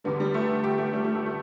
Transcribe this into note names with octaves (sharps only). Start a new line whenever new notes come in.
E2 D3 G3 B3
G3
A3
G4
A3
G3
A3
A3
A3